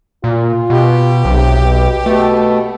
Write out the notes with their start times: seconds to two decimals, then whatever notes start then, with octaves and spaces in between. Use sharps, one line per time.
0.24 A#2 F4
0.70 B2 G4
1.25 B1 C3
1.63 B2
2.06 B2 A3